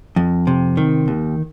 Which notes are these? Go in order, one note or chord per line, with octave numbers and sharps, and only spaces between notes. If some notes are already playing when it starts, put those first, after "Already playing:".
F2
C3
D#3
D#2